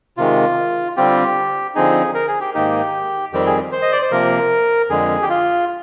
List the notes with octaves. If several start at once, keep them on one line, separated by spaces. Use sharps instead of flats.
C3 D#3 G#3 F4
D3 G3 C4 F4 G4
D3 F3 C4 D#4 G#4
A#4
G#4
G4
G#2 D#3 A#3 D#4 G4
F2 D#3 G3 C4 G4
G#4
C5
D#5
D5
C5
C3 F3 A#3 A#4
F2 D3 G#3 G#4
G4
F4